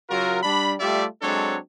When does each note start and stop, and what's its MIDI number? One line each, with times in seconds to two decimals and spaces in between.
0.10 0.43 49
0.10 0.43 54
0.10 0.43 65
0.10 0.43 66
0.10 0.43 70
0.43 0.74 55
0.43 0.74 62
0.43 0.74 83
0.80 1.05 55
0.80 1.05 57
0.80 1.05 65
0.80 1.05 67
0.80 1.05 74
0.80 1.05 76
1.22 1.56 54
1.22 1.56 56
1.22 1.56 60
1.22 1.56 62
1.22 1.56 69
1.22 1.56 73